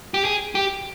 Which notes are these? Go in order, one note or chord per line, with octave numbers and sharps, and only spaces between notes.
G4
G#4
G4